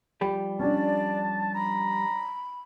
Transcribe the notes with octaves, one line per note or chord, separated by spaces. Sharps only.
F3 G3 G4 B5
C#4 D4 D5 A5
A#5 B5